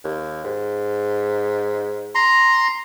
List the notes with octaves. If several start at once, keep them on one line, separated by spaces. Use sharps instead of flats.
D#2
G#2
A#5 C6